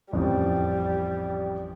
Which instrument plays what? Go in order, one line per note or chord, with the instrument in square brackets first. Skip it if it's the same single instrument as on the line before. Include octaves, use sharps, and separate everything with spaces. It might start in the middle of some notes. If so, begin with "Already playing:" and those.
[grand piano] A1 F2 [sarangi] G3